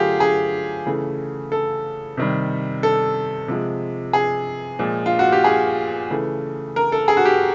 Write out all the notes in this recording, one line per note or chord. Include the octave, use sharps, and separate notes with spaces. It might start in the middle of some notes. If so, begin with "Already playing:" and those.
Already playing: D3 F#3 A3 F4 G4 G#4
G#4
C#3 E3 A3
A4
C3 D#3 G3
A4
C3 F3 G#3
G#4
A#2 F3 G#3
F4
F#4
G4
G#4
C#3 E3 A3
A#4
A4
G#4
F#4
G4